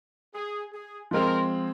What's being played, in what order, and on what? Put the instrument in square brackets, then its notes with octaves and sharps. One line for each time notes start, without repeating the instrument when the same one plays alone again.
[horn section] G#4
G#4
[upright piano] F3 G#3 C4 [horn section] A#4